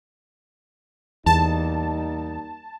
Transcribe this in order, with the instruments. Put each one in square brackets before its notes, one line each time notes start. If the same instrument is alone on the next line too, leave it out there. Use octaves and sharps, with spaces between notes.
[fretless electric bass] E2 [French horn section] G3 A#3 D#4 [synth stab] A5